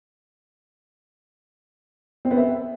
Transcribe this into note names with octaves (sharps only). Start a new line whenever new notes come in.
C4
B3
E5